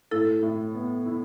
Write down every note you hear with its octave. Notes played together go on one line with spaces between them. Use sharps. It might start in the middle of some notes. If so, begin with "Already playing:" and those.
A2 E4 A4
A2
B3
E4